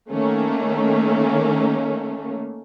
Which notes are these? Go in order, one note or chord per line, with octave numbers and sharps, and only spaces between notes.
D#3 A3 A#3 C#4